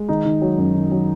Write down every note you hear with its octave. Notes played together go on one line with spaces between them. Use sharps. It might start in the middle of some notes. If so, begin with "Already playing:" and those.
Already playing: G#3
D#3 D#4
D#3
F#3
F#2
D#3
F#3